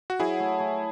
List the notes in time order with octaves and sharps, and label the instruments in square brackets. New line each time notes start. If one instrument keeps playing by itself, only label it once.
[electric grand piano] F#4
[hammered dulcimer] F#3 [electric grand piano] E4 G#4
[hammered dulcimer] A3
A3